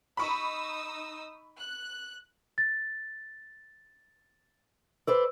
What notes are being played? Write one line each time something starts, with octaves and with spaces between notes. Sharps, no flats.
D#4 B5 C#6 D#6 E6
F#6
A6
B4 C5 D5 E6